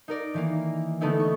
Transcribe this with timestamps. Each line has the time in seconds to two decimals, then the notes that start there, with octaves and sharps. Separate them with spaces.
0.08 D#4 A#4 D5
0.34 D#3 E3 A#3
1.01 D3 A3 B3 D#4 E4
1.20 C#6